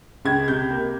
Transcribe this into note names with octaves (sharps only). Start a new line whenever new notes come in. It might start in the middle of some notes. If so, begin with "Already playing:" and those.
C#2 G#6
C3 G6
A#3